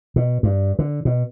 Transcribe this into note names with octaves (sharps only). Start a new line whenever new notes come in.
B2
G2
D3
B2